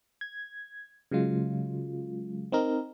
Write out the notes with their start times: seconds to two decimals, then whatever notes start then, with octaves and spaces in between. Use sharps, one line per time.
0.21 G#6
1.11 C#3 F#3 G#3 F4
2.52 C4 D#4 A#4